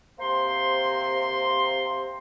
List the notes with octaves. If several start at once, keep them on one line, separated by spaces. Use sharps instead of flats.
C3 A#3 C5 C6